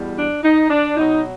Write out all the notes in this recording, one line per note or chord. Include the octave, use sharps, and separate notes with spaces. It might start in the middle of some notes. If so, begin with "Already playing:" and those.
Already playing: E2 B2 G3
D4
D#4
D4
B2 F#3 D#4